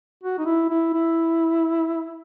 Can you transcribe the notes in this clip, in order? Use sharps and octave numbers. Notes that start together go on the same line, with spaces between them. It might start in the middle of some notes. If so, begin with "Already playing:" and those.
F#4
D#4
E4
E4
E4